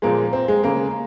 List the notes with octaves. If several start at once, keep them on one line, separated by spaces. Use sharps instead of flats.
A#2 F3 G#3 A#3
C4
G#3
C#3 G#3 A#3